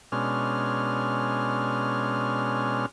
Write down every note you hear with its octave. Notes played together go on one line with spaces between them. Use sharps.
B2 G#3 C#4 D4 C6 F6